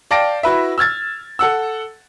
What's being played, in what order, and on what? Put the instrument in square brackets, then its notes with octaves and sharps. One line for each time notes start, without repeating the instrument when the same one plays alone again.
[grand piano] D5 F5 G5 A5 A#6 D7
E4 F#4 B4 E5
E6 F6 G#6 A6
A4 F#5 E6